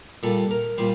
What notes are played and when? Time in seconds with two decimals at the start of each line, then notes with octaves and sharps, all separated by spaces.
0.23 A#2 G3 A4
0.51 A#4
0.78 A#2 G3 C5